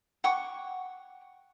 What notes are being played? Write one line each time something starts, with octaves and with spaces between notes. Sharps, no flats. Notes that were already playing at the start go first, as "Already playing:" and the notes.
F#5 G5 C#6 D6